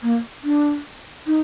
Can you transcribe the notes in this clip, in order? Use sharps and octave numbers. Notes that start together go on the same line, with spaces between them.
A#3
D4
D#4